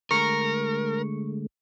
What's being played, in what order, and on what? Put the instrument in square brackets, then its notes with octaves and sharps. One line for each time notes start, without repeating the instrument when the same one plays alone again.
[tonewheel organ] D3 G#3 A3 [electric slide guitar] A#4 [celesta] C#6 C#7